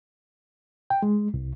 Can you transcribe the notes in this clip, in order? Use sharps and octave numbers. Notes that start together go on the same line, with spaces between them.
G5
G#3
C2